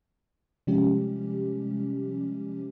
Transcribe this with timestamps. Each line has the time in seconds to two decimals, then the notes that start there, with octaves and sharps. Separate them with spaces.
0.67 C3 F3 G3 G#3 C#4 G4